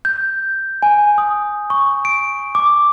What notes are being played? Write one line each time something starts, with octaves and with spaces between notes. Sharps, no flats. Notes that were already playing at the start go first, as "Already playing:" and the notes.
G6
G#5
D#6
C#6
D7
D6